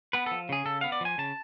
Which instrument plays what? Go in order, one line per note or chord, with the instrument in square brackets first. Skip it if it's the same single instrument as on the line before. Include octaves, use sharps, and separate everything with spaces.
[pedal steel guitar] B3 B4
F3 A4
C#3 G#4
C#3 A4
B3 F5
D5
F3 G#5
C#3 A5